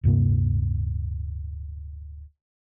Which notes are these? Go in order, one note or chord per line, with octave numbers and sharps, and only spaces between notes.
D1 G2 C3 A#3